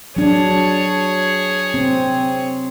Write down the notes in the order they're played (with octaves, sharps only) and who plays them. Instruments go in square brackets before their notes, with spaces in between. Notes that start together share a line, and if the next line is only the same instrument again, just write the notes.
[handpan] F#3 D4 [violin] G#4 C#5
[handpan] C4